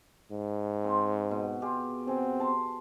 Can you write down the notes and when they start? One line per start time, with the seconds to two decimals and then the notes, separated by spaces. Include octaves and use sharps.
0.32 G#2
0.84 C4 C5
1.31 B2
1.62 F4 G4 G#4
2.08 C4 G#4 F#5
2.40 A5 C6